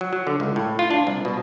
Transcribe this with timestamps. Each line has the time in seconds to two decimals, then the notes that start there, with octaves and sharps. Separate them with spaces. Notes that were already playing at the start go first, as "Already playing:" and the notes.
0.01 F#3
0.13 F#3
0.27 D3
0.40 C#2
0.56 A2
0.79 F4
0.91 D4
1.07 C2
1.25 B2